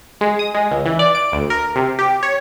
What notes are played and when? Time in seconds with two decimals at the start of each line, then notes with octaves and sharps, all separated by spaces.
0.21 G#3
0.39 D#6
0.55 G#3
0.71 C#2
0.86 E3
0.99 D5
1.15 D7
1.32 D2
1.50 A#4
1.75 C3
1.99 G4
2.23 C#5